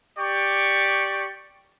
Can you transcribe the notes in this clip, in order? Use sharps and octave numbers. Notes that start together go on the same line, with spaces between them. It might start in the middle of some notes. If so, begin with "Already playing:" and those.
G4 D5 C#6